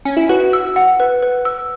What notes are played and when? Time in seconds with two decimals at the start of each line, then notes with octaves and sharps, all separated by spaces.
0.05 C#4
0.17 E4
0.29 F#4 B4
0.53 E6
0.76 F#5
1.00 B4
1.23 B4
1.45 E6